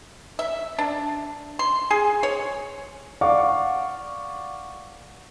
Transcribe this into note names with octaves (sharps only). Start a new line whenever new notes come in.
E5
D4
C6
G#4
C#5
D5 F5 F#5 C#6 D6